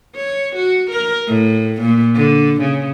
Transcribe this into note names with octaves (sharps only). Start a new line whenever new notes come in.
C#5
F#4
A#4
A2
A#2
D3
C#3